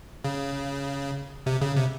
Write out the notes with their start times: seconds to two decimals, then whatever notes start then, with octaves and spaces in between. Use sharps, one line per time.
0.24 C#3
1.46 C3
1.62 C#3
1.77 C3